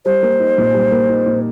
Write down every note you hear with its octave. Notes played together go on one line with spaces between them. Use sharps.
G3 C5
A#3
D#4
A#2
G3
A#3
D#4
A#2